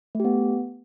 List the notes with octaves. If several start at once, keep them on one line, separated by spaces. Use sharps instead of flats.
A3 B3 G4